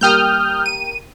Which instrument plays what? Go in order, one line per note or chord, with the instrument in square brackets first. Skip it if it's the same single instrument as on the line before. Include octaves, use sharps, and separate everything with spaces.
[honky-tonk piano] G3 A#3 G5 [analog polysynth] D#6 F6 G6
[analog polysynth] D#7